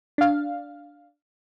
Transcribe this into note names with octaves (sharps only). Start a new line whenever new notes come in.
D4 F5